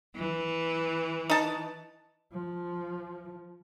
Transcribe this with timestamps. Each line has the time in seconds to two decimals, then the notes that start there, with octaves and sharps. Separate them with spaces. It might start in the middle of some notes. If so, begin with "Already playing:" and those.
0.16 E3
1.30 D#4 A5
2.33 F3